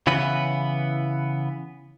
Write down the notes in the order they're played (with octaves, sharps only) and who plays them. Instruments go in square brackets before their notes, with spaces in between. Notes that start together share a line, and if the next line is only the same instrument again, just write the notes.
[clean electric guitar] C#3 E3 B3 B4